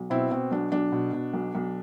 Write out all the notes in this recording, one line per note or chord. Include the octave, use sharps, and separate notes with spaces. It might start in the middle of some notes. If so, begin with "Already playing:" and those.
Already playing: B1
B2 C4 E4
B2 C4
B1 D4
B1 D4
B2
B2
B1
B1